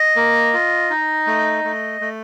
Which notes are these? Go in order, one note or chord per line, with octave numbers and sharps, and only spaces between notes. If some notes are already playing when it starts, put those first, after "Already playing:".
Already playing: D#5
A#3
F4
D#4
A3
A3
A3